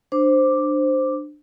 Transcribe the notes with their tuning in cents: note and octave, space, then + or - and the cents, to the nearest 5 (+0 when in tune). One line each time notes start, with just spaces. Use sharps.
D4 +20 C5 +0 D6 +0